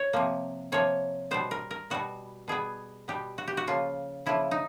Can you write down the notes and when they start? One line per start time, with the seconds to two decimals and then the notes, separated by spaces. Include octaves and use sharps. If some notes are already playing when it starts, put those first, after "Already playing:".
Already playing: C#5
0.13 C3 F3 A#3
0.72 C3 F3 A#3 C#5
1.31 B2 G3 B3 C5
1.51 A#4
1.71 A#4
1.90 B2 G3 B3 F#4
2.48 B2 G3 B3 G#4
3.08 B2 G3 B3 G4
3.38 F#4
3.48 G4
3.57 F#4
3.67 C#3 F3 A#3 F4
4.26 C#3 F3 A#3 E4
4.51 D#4